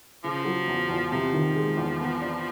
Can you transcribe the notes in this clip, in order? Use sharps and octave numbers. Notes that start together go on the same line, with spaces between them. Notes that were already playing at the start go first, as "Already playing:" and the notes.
C#3 F3
F#3
E2
E2
C3 F3
D#3
G#3
E2
B3
D4